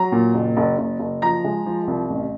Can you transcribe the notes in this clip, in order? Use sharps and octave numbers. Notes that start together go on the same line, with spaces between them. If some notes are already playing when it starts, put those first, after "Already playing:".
Already playing: F#3 A#5
A#2
F#1
F#1
F#1
F#1
F3 A#5
G#3
F3
C2
A1